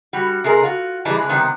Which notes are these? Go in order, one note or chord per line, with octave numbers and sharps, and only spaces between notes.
G3 F#4
C3 G#3 G#4 A#4
F4 F#4
C3 E3 G3 G#3 A5
C3 G#3
C3 D#3 G3 B3